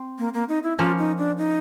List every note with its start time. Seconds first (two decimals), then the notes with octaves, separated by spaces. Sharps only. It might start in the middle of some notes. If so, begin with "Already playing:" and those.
Already playing: C4
0.19 A#3
0.34 A#3
0.49 D#4
0.63 E4
0.78 F3 A#3 C#4 F4
0.98 D#4
1.18 D4
1.38 D#4